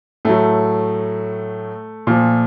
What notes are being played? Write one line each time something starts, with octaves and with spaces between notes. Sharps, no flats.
A2 F#3 A3
A#2 F3